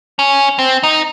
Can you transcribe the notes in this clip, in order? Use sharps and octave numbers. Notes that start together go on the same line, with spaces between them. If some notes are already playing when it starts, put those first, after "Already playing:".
C#4
C4
D#4